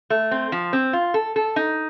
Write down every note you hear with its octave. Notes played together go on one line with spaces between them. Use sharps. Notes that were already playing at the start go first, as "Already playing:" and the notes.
A3
C4
F3
C4
F4
A4
A4
D#4